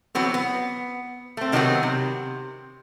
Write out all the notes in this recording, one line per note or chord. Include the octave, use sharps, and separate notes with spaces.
E3 F#3 B3 C4
B3
A3 C4
C3 D#3 F#3 A3 B3 C4
C3